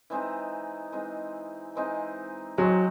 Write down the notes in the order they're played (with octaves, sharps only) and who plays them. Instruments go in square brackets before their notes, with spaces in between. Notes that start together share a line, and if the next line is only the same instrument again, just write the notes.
[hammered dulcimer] E3 G#3 C4 D#4
E3 G#3 C4 D#4
E3 G#3 C4 D#4
[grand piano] F#3 [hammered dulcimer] G#3 C4 F#4